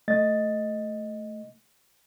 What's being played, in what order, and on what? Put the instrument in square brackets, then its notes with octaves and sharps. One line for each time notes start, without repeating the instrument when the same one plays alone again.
[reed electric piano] A3 D#5 A6